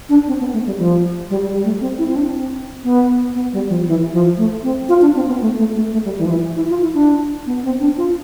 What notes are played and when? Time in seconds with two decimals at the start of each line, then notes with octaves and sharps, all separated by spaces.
0.09 D4
0.27 C4
0.40 B3
0.53 A3
0.66 G3
0.78 F3
1.30 G3
1.46 G3
1.64 A3
1.81 C4
1.98 E4
2.08 C4
2.16 D4
2.33 C4
2.84 B3
3.35 B3
3.53 G3
3.69 F3
3.87 E3
4.12 F3
4.37 A3
4.63 C4
4.89 F4
5.02 D4
5.15 C4
5.28 B3
5.41 A3
5.58 A3
5.75 A3
5.92 A3
6.05 G3
6.18 E3
6.26 F3
6.30 E3
6.56 E4
6.70 F4
6.83 E4
6.94 D4
7.46 B3
7.64 C4
7.80 D4
7.98 F4